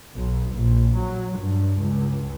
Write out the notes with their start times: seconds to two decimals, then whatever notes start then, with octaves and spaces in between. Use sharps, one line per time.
0.16 B1
0.54 A#1
0.96 F#3
1.38 G2
1.80 C#2